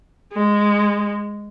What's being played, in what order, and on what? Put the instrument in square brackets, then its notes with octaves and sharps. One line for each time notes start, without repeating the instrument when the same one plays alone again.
[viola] G#3